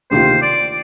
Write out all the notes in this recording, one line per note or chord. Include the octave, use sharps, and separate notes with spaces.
D2 C3 D#3 A#3 F4 C5
D5